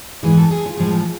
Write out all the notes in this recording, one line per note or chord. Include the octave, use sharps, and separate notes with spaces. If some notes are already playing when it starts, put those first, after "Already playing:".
G#2 E3 G#3 G#4
A4
G#4
F4
A2 F3 G#3 G#4
F4